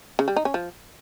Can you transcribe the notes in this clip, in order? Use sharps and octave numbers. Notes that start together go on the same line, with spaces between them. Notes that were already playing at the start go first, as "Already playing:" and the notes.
C#3
G3
D#4
C#4
F3